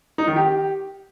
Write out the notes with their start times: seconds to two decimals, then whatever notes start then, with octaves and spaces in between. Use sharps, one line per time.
0.18 D#4
0.27 D#3
0.36 G4